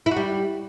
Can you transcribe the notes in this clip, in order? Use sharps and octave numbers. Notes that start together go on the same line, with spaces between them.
E4
F#4
G3